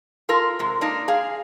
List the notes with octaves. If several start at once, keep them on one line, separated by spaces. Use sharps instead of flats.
F4 A4 A#4
C3 G#3
A#3 D4 D#4
G#4 F5